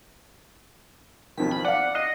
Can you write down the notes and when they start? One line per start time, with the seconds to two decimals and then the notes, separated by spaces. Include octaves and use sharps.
1.37 B1 F2 D#3 B6
1.51 B5
1.65 D5 F5 F#5
1.95 D#5 C7